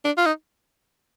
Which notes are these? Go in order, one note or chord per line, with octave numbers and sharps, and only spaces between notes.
D4
F4
D#4